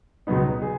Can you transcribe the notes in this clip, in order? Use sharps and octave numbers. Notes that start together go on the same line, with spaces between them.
C#2 B2 F#3 B3 D#4
G#4